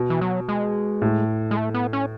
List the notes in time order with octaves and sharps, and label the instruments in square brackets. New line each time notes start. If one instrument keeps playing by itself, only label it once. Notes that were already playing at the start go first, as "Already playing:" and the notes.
Already playing: [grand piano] B2
[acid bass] E3
F#3
G#3
[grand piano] A2
[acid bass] G#3
A3
B3
C#4